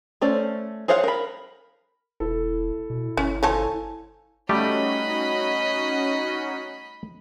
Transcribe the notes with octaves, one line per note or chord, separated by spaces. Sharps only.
A3 C#4 C5 D5
G#4 C5 C#5 F5 F#5
A#4 B5
E1 E4 A4
B2
G1 C#4
F3 A4 C#5 G#5 A5
G3 A3 C#4 D#4 F#4 G4 D#5 B5